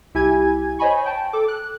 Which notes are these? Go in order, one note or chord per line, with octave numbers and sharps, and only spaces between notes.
C2 E4 G4 G#5 G#6
C5 C#5 D#5 G#5 B5 C#6
G5 A5
A4 D6
F#6